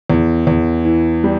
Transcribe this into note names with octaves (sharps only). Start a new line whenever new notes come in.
E2
E2
E3
G3